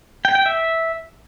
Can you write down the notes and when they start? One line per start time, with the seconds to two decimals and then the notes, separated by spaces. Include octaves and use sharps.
0.25 G5
0.35 G5
0.46 E5